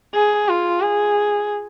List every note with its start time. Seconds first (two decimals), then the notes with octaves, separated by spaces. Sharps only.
0.15 G#4
0.49 F4
0.82 G#4